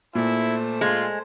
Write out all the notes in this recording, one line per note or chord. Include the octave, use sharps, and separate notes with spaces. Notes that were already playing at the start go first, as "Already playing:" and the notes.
A#2 A3 E4 C5
G#3 F4